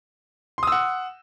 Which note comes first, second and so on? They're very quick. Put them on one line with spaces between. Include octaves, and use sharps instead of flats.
C6 D#6 E6 F#5